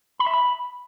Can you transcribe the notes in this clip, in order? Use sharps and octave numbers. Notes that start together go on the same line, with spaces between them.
B5
E5
B5